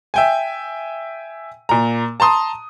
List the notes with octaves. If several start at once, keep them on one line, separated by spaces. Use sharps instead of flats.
E5 G5 G#5
A#2 A#5
A5 A#5 C6 D#6